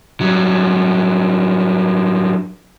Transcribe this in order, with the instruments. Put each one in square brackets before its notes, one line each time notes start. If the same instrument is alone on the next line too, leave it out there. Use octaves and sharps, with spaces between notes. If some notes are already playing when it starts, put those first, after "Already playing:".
[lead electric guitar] G2 F#3